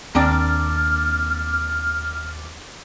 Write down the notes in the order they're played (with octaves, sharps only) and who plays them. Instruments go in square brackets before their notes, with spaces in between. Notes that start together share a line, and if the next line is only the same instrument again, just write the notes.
[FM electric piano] D#2 D6 A6 [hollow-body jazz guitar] A#3 C4 D4 [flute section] F6